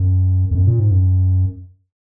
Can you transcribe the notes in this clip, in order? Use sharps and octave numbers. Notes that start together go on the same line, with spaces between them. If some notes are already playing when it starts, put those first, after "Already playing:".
Already playing: F#2
F2
F#2
A#2
G#2
F#2